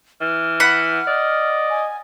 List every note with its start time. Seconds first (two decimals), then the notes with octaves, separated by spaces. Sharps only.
0.21 E3 F6
0.60 F#5 B5
1.07 D5 D#5
1.70 G#5